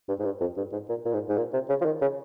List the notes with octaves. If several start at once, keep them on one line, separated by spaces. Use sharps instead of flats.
G2
G#2
G2
F2
G2
G#2
A#2
A#2
G#2
G#2
A#2
C3
C#3
F3
D#3
C#3